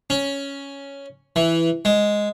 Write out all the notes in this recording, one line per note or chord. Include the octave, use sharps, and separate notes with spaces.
C#4
E3
G#3